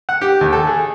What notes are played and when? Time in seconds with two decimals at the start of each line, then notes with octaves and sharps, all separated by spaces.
0.09 F#5
0.21 G4
0.41 D#2
0.53 A4
0.67 G#4